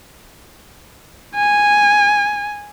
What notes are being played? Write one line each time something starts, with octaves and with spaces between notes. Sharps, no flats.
G#5